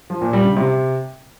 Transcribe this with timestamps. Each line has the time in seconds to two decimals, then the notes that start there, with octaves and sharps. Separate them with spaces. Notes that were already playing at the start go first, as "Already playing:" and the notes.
0.10 F3
0.22 A#2
0.33 G3
0.45 C#3
0.56 C3